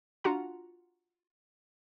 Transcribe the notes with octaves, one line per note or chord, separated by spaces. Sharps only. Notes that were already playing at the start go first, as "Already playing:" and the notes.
D4 F4 F#4 F#5 A#5